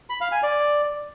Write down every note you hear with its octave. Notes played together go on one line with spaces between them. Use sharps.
B5
F5
G#5
D5